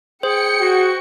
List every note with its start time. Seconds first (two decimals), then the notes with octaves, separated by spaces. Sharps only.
0.23 G#4 C5 G5 C#7
0.60 F#4